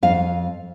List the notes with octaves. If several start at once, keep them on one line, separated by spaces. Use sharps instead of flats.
F2 F5